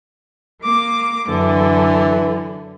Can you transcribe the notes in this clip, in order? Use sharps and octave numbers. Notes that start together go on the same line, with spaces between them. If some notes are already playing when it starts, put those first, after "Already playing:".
A#3 D6
F#2 D3 E3